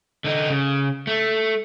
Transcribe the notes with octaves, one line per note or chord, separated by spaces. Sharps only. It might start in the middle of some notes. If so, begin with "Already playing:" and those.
D3 D#4
C#3
A3